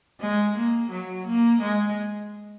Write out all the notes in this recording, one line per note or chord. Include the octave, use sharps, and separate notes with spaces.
G#3
A#3
F#3
A#3
G#3